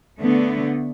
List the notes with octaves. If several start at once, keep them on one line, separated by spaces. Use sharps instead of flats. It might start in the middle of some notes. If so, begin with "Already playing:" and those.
D3 A3 B3